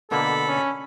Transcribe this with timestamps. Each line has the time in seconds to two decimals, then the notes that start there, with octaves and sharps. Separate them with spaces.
0.11 B2 D3 A#3 A4 B5
0.48 C#4